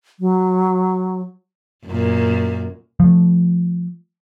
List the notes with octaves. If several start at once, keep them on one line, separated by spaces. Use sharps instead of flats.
F#3
F#2 A#2
F3 A3